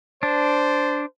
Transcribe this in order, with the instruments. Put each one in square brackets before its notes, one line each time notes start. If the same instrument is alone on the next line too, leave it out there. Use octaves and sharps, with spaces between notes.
[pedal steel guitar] D4 [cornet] C5